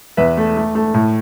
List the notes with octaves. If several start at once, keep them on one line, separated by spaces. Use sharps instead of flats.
E2 B4 E5
A3
A3
A3
A2